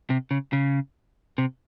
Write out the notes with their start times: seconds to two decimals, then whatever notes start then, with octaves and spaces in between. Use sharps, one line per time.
0.10 C3
0.31 C#3
0.53 C#3
1.38 C3